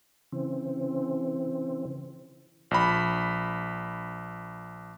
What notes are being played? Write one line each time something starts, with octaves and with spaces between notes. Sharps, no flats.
C#3 E3 C4
A#1 B5